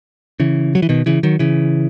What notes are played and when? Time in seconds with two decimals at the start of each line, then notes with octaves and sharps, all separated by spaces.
0.40 C#3 E3
0.75 F#3
0.82 E3
0.89 B2 D#3
1.06 C#3 E3
1.23 D#3 F#3
1.39 C#3 E3